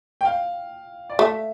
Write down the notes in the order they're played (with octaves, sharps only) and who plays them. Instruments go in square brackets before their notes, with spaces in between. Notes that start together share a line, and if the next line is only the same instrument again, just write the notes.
[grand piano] G5
F5
D5
[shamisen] A3 [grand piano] E5